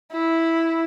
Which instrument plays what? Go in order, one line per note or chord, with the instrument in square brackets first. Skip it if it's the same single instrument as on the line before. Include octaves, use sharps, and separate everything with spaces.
[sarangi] E4